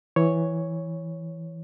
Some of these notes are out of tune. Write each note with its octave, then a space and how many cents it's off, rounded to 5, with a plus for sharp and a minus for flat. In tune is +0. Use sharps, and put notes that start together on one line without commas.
E3 +0 C#5 +0